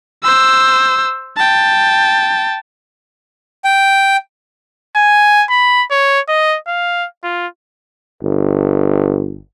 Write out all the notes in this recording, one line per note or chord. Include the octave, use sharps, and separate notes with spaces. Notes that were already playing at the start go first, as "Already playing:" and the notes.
C5 E6
G5 A5
G5
G#5
B5
C#5
D#5
F5
F4
G1